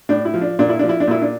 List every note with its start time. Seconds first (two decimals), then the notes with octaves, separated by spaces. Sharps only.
0.09 A2 D4
0.25 E4
0.34 F3
0.41 D4
0.59 A#2 D4
0.69 E4
0.79 F3 D4
0.89 E4
1.00 D4
1.07 A#2 E4
1.22 D4